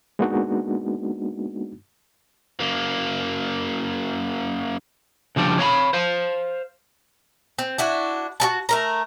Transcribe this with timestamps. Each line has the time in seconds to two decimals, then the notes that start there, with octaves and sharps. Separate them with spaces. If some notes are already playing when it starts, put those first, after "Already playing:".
0.19 G#3 A#3 B3 D4 D#4 F#4
2.60 F#2 A#3
5.36 C#3 F3 G3 D4
5.59 C#5 F5 A#5 B5
5.93 C5 F5
7.59 C4
7.78 D4 E4 F#4
8.40 F#4 A4 A5
8.69 A3 A#4 A#5